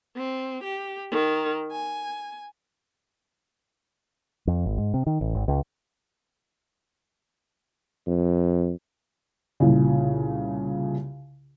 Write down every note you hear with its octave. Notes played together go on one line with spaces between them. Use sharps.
C4
G4
D#3
G#5
F2
G#1
G#2
C3
D#3
A1
G#1
C#2
F2
C2 A#2 C#3